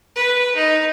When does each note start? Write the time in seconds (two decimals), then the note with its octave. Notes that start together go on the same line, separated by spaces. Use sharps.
0.16 B4
0.55 D#4